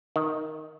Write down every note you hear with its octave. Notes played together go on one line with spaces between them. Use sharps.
D#3